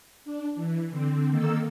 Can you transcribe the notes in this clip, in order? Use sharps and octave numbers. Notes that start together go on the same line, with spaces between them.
D4
E3
D3 C4
D#3 A#3 A4 E6